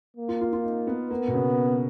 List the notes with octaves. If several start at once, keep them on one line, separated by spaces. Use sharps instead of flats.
A#3
F4
F4
F4
D#4
B3
A#3 B3
B2
C#3